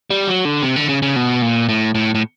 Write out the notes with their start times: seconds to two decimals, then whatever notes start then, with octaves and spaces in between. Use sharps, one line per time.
0.10 G3
0.27 F#3
0.45 D3
0.62 C3
0.76 D3
0.89 C#3
1.02 C#3
1.16 B2
1.42 A#2
1.69 A2
1.95 A2
2.15 A2